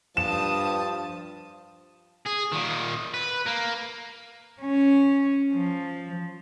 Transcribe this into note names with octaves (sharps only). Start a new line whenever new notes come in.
G2 F3 A5 D#6 E7
G#4
A#2 D#3
B4
A#3
C#4
F3